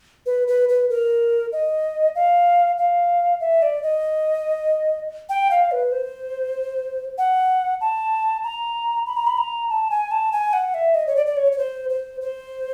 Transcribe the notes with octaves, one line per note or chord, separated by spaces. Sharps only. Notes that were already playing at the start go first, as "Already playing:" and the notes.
B4
B4
B4
A#4
D#5
F5
F5
E5
D5
D#5
G5
F5
B4
C5
F#5
A5
A#5
B5
A#5
B5
A#5
A5
G#5
A5
G#5
F#5
E5
D#5
C#5
D5
D5
C#5
C#5
C5
C5
C5